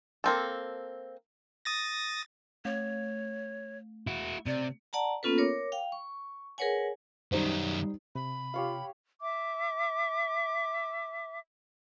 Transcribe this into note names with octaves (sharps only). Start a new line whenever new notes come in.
A#3 C4 A4
D#6 A6 A#6
A3 C#5
E4 F#4
C3 D5
D5 F#5 A5 A#5
A#3 B3 C#4 F4 A4 B4
A#4 C#5 D6
F5 G5
C#6
G#4 A#4 B4 C#5 F#5 G#5
F#2 D#3 G3 D#4 C5
C3 B5
F4 G4 C#5 F5
E5 D6